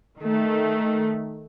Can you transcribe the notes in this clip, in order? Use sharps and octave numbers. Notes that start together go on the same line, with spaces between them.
D#3 A3